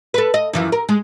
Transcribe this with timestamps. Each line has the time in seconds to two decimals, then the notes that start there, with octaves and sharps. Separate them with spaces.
0.14 A4 B4
0.34 D#5
0.53 F#2 E3 F3
0.72 A#4
0.89 G#3